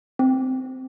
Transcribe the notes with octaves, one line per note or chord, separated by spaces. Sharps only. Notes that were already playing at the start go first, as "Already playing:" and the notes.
C4